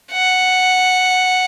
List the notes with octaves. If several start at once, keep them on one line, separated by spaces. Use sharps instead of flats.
F#5